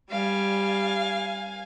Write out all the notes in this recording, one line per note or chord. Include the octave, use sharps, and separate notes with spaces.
G3 F5 G#5